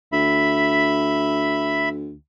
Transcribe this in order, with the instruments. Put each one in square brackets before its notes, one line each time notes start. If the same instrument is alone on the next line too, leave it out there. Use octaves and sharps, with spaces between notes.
[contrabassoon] D2 [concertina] E5 B5